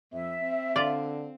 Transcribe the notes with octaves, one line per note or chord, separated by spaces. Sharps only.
F2 E5
C4
D3 F4 D5